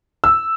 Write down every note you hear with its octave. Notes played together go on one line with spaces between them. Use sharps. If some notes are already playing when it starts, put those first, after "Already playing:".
E6